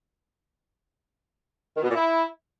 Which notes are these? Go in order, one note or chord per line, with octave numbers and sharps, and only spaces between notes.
D#3
B2
A#2
E4